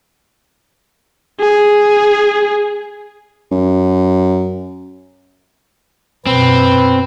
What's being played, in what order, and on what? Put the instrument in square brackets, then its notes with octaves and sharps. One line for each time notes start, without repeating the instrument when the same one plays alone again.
[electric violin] G#4
[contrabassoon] F#2
[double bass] F#2 B2 [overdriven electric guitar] C4 [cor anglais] B4